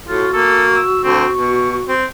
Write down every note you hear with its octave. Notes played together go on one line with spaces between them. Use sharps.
A2 F4 F#4
A#3 A4
E6
D2 C4
B2 C#6
C4